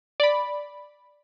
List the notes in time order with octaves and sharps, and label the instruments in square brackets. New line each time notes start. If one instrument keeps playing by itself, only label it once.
[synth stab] D5 B5